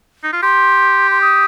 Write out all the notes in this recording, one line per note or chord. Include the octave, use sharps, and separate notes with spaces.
D#4
F4
G4 C6
C6
D#6